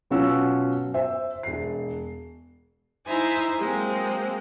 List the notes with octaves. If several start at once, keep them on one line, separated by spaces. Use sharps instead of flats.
B2 F#3 C#4 F4 F#4 E6
C5 E5
E1 C7
D#4 E4 C5 E5 G#5 A#5
F#3 G#3 A#3 C4